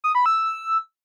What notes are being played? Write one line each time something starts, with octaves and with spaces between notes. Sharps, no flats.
D#6
B5
E6